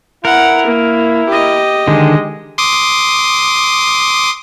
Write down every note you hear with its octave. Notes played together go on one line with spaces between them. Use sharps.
E4 A#4 F#5
A#3
G4 D#5
D3 D#3 G#3
C6 D6 D#6